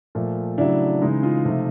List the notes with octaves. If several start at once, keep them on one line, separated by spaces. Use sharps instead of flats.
A#2 F3 A3
C#3 F#3 A3 D4 E4
C#3 E3 G#3 D#4
D#4 F4
C3 F3 A3